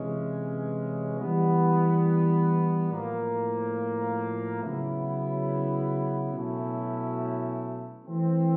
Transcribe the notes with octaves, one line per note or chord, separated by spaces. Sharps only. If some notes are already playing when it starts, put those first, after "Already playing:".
Already playing: C3 E3 G#3 C#4
E3 G3 B3
A2 F3 A#3
C#3 F#3 B3 E4
B2 F#3 A3 C#4 E4
E3 A3 C4